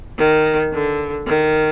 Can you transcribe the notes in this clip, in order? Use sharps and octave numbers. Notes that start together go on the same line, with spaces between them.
D#3
D3
D#3